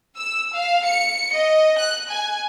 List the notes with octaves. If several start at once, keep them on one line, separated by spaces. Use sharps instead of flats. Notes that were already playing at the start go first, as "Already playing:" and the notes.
E6
F5
C#7
D#5
F#6
G#5